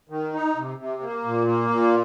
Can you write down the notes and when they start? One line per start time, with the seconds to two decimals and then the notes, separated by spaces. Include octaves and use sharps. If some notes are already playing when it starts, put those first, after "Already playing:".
0.09 D#3
0.33 D#4
0.56 C3
0.78 C3
1.01 A#3
1.25 A#2
1.47 A#3
1.70 A#2